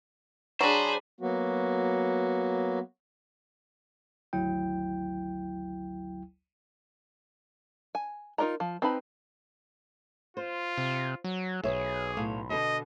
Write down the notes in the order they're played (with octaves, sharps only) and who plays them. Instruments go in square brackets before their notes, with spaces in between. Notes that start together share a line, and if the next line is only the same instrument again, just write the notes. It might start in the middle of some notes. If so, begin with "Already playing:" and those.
[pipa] F#3 D4 [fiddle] G#4 B5 [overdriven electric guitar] C5
[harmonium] F#3 A#3 B3 F#4
[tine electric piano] G#1 D2 F#3 E4 G5
[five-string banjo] G#5
D#4 F4 A#4 D#5 A#5
F3
C4 D#4 B4 A5 B5
[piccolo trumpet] F4 [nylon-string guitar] C5
[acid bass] C3
F#3
[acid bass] B1 [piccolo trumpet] G#4 [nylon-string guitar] B4 C#5 E5
[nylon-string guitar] A2 F5
[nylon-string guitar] B2 D3 [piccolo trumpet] D#5